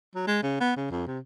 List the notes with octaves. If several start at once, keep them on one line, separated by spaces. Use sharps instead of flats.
F#3
G#3
C#3
B3
C#3
F2
C3